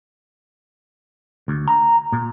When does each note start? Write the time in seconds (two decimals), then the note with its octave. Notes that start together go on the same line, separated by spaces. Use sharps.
1.48 D2
1.68 A#5
2.12 A#2